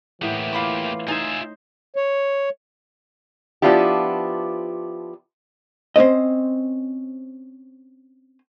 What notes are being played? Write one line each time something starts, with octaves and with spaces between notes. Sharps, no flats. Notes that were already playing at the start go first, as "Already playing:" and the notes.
A2 E3 A#3 B3 G4
F4 B5 D6
D#4 F4 C5 E5 G#5
C#5
F3 B3 D4 E4 F4 G4
C4 C#4 C5 D#5